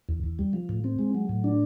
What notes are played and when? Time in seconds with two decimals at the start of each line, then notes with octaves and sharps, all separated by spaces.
0.09 E2
0.24 E2
0.39 G3
0.53 F3
0.69 A2
0.84 C4
0.99 G#3
1.15 F#3
1.29 A2
1.44 D4